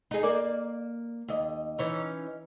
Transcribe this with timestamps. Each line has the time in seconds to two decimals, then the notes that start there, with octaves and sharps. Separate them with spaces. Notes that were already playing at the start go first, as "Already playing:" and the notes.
0.11 D#4 G#4
0.23 A#3 A#4 D5
1.28 D#2 D#5
1.79 E3 C#4 D#4